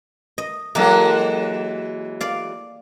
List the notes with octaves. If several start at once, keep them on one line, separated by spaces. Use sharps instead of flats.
D#5
E3 F#3 G#3 A#3 G4 A4
D5 F5